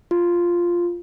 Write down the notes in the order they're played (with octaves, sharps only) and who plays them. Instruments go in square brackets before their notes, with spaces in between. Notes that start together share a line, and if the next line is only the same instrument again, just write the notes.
[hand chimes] F4